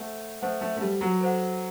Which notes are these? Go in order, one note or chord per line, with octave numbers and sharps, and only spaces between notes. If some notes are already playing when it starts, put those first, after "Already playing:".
Already playing: A3 A4 C5 F#5
A3 A4 C5 F#5
A3
A3
G3
F#3
A4 C5 F#5